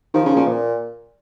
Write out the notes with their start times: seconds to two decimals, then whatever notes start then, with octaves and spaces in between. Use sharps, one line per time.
0.14 D#3 F3
0.25 C#3
0.36 A#2
0.48 A#2